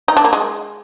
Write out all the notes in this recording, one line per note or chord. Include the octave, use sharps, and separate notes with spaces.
D#4
D4
A#3
G#3